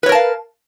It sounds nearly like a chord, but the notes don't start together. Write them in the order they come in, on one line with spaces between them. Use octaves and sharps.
B4 C#5 A#4 A5 F5